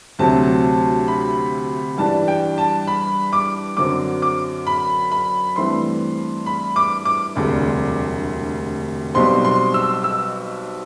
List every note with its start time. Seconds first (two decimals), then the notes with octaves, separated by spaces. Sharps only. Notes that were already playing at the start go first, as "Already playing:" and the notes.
0.19 D2 C3 F#3 A3 C4 A5
1.08 B5
1.98 G2 E3 G3 D4 A5
2.28 G5
2.58 A5
2.87 B5
3.33 D6
3.77 F#2 D3 F#3 C4 D6
4.22 D6
4.67 B5
5.12 B5
5.56 G2 E3 A3 C4 C6
6.46 B5
6.76 D6
7.05 D6
7.36 E1 D2 C3 G3
9.14 B1 B2 G3 C4 C6
9.45 C6
9.74 E6
10.04 E6